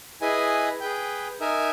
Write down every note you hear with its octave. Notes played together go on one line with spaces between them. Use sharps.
E4 G#4 B4 D#5 G#5
G#4 B4 G5
D#4 A#4 E5 G#5